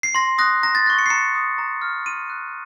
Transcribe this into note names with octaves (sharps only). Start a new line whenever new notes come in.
C7
C6 A#6
D#6 F#6 A#6
A#5 A#6
A6
C#6 F#6 A#6
C#7
C7
A#5 C#7
D#6 F#6
A#5
F6
C6 D#7
F#6